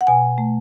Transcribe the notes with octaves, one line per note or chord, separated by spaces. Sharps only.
F#5
B2 G#5
A3